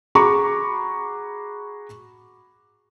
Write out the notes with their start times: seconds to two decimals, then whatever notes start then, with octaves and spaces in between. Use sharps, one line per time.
0.15 F#4 G#4 A#5 B5 C#6 D6